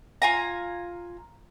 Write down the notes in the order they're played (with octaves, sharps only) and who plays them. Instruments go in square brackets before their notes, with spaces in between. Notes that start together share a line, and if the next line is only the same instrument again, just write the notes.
[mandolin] F4 G#5 A#5